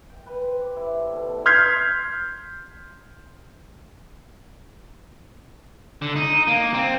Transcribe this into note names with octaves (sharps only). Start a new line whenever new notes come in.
G5
B4
C5
G4
E4
D3
B2
A3
C6 F6 G6 G#6 B6 C7
D3
D#4
A#3
C4